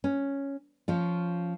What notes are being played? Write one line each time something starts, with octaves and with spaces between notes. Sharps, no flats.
C#4
F3 C#4 F4